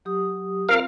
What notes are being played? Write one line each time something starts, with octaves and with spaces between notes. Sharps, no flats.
F#3 G4 D#6
C4 F4 A#4 C5 F5